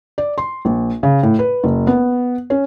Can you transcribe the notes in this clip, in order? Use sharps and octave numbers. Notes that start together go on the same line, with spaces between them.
D5
C6
A#1
C#3
A2
B4
F#1
B3
C#4